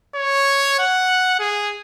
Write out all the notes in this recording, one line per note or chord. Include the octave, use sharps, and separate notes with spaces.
C#5
F#5
G#4